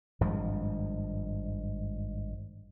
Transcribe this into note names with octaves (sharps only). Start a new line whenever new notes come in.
G#1 G2 F3 G#3